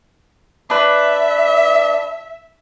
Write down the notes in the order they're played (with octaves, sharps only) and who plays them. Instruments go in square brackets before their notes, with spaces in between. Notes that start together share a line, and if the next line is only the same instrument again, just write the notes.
[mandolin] D4 B4 [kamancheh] E5